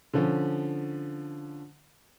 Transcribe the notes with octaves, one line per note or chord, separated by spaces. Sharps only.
D3 F3 C#4